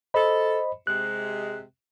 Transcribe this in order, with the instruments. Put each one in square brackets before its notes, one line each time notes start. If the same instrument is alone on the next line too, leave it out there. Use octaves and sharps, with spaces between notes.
[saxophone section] A4 [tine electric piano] C5 D#5 B5
[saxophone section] C3 G#3 [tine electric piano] F#6